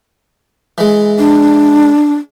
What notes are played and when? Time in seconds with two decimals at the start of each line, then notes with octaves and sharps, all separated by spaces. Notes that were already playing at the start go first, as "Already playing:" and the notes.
0.78 E3 G#3
1.19 D4